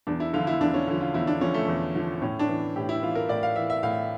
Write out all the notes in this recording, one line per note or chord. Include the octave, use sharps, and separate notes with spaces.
E2 D4
E4
D3 F3 F4
E4
E2 D4
C#4
D3 F3
F4
E2 E4
D4
D3 F3 C#4
A3
E2
D3 F3
A2 C#4
D4
E3
A2 G4
E4
E3 F4
A#4
A2 D5
F5
E3 E5
E5
A2 F5